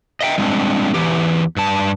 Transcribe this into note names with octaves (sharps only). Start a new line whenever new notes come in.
D#5 E5 G5
G3 G#3 C4 D4
E2 E3 G4
G2 A5